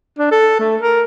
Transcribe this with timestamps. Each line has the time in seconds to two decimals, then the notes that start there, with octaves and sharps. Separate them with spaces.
0.19 D4
0.32 A4
0.59 A3
0.82 A#4